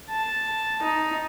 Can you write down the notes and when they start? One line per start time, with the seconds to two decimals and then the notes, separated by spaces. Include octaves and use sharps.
0.10 A5
0.82 D#4